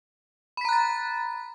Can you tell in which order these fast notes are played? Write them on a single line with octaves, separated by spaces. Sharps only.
B5 B6 A#5 F#6 A6